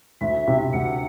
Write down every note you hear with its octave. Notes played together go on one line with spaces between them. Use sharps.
D2 E5
C3
D2 F#5